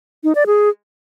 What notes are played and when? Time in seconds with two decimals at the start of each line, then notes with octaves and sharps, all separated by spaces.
0.24 D#4
0.35 D5
0.47 G#4